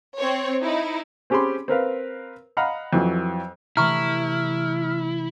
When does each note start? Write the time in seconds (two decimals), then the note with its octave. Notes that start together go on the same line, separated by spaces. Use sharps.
0.19 C4 C#5
0.62 D#4 E4
1.30 C4 C#4 G4 G#4 B5 C6
1.68 C4 A#4 B4 F5
2.57 D#5 F5 F#5 A#5 B5 F6
2.93 F2 E3 F#3
3.77 C3 E3 A3 E4 A#5 C#6 F6